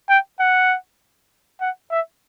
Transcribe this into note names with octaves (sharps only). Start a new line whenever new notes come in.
G5
F#5
F#5
E5